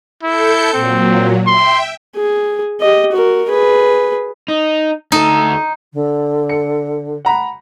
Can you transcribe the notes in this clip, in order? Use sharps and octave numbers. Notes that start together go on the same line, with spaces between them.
E4 A4 G6 C#7
A#2 F#3 C4
E5 G5 C6
G#4
G4 D#5
F#4 A#4
G#4 B4
D#4
D2 D#4 A4
D3
C#7
F#5 A#5 B5